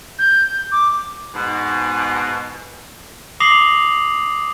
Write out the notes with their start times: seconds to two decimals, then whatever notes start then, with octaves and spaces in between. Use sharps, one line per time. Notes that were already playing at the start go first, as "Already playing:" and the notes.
0.19 G6
0.72 D6
1.34 G#2 B2
3.40 D6 D#6 A#6 C7 F7 F#7